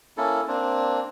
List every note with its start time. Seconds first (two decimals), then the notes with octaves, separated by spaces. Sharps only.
0.17 A#3 C#4 E4 A4
0.48 A#3 C4 D4